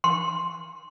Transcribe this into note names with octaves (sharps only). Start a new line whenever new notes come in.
C6